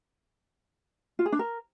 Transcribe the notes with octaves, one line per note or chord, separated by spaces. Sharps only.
F4
G#4
D4
A#4